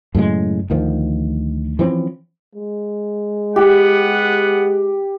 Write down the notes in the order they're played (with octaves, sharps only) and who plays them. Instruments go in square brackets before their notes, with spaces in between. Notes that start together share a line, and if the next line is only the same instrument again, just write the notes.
[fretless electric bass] F#2 A2 C#3 G#3
D2 D#3 F3
E3 F3 C4 C#4
[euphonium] G#3
[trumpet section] B3 F#5 [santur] G4